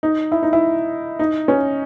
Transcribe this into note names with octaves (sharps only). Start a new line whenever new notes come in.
D#4
E4
D#4
E4
D#4
C#4